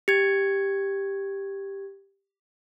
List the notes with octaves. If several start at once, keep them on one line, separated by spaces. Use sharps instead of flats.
G4 G#6